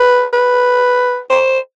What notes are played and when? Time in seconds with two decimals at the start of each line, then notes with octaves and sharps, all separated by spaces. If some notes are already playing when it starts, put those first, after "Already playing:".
Already playing: B4
0.33 B4
1.30 C5